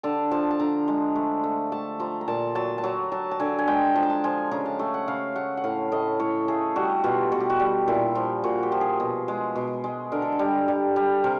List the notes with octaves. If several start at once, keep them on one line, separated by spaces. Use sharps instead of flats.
D3 A5
F3 A5
A5
D3 A#5
G#3
A3
A3
A3 A5
F3 A#5
A#5
A#2 A5
F#3 A5
A5
F#3 A#5
F#3 A5
A5
D3 G#5
G#5
G#3 G5
F3 A5
A#5
A5
F3 G#5
C#3 A#5
A5
A3 G#5
F#5
C#3 F5
A3 F#5
F#5
A2 F5
A2 D#5
A2 C#5
A3 G#4
G3 F#4
B2 F4
B2 F#4
G4
F#4
G3
A#2 E4
F3
A#2 F#4
G4
F3
G#4
B2
G#3
B2
G#3
D3 A#4
A4
A#4
G3
G3
G3
C3 A#4